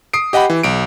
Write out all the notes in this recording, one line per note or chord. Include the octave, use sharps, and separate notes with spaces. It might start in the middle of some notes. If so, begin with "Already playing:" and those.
D#6 C7 D7
G4 D#5 F#5 G5 B5
E3
B1 D7